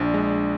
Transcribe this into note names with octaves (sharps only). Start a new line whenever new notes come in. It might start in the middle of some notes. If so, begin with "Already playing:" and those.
Already playing: A#1 D4
G#3